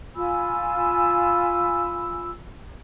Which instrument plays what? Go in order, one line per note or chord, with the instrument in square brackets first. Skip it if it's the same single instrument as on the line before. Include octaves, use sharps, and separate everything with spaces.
[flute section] F4 G#5 B5 E6